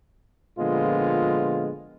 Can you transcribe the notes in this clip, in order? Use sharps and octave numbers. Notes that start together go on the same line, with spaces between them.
A#2 D3 F3 G#3 B3 F4